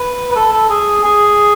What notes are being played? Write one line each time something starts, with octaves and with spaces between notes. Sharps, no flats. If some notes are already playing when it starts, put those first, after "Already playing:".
Already playing: B4
B4
A4
A4
G#4
G#4